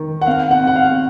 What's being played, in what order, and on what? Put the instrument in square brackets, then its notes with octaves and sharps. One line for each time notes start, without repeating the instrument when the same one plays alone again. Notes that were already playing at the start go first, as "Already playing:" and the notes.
Already playing: [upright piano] D#3
[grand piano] F#5
[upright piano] C4 [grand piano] F5
[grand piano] F#5
[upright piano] C4 [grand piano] F#5
[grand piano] F5